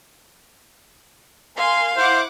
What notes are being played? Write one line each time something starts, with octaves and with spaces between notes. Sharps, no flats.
A#4 F5 G#5 C6
E4 C5 F#5 D6